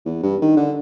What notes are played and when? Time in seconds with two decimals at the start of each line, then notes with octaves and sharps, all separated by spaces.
0.05 E2
0.22 G2
0.42 D#3
0.57 D3